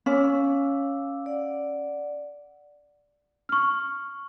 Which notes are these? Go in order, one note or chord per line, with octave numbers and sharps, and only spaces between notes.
C#4 F5 D6 E6
D5 F#5
C#6 F6